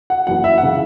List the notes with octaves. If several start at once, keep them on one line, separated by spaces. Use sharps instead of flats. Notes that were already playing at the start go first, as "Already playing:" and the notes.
F#5
F#1 F#2 E3 F#5
E5
F#5
C#3 E3